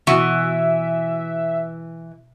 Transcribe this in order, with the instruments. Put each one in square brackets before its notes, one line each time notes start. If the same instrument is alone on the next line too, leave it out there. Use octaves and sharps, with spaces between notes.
[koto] B2 F#4 [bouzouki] E3 [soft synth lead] E5